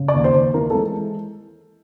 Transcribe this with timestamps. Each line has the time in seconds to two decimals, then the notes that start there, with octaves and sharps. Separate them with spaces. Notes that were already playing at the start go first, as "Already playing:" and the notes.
Already playing: C#3
0.08 D5
0.14 D#2
0.24 C5
0.34 D#2
0.54 E3 A#4
0.70 G#3 A4